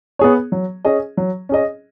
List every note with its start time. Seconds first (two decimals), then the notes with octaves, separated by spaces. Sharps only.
0.19 B3 G#4 C#5
0.52 F#3
0.85 C#4 G#4 D#5
1.17 F#3
1.49 C#4 G#4 D#5